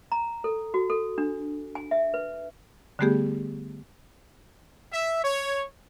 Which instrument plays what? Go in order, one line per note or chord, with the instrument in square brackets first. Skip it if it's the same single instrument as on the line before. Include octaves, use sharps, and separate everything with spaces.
[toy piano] A#5
A4
F#4
A4
D4
G#5
E5
B4
[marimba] D3 G3 A3 B3 G4 G#4
[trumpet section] E5
C#5